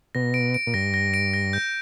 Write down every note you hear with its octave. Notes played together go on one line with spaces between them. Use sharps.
B2 A#6
D7
D7
A#2
G2 A#6
A#6
D7
A#6
G6